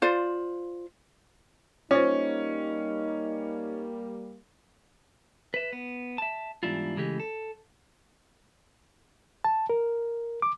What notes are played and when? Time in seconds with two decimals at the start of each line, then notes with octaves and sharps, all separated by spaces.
0.02 F4 C5 D5
1.91 G3 A#3 C#4 D#4 F4 C5
5.54 B4 E5
5.73 B3
6.18 E5 A5
6.63 E2 G#2 G3 D4 E4 F4
6.97 C#3 E3 G#3 A3 G4
7.20 A4
9.44 A5
9.70 A#4
10.42 D6